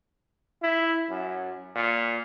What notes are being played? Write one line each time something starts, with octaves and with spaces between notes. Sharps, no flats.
E4
F#2
A#2